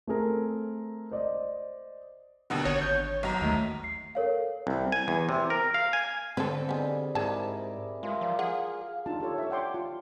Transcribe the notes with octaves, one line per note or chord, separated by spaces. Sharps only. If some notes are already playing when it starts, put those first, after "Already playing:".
A3 C4 G#4 A#4
C5 D5 D#5
D#2 B2 D3
G#1 C#5
G6
B1 F#2 A#5
D#2 D#3 A3
C7
A4 A#4 C#5 F5
C2
G#5
E2
C3
A#4
F5
G#5
D3 C4 A4 B4
D#3 G3 B3 G#4
G#2 E4 G#4 A#4 D5 A5
G#3 F4 A#4 E5
F3 D5 F5
G#4 F5 F#5
D4 D#4 F4 F5 A5
F4 G4 A4 C#5
C#5 E5
D5 F#5 G5 C6 D6
A5
F4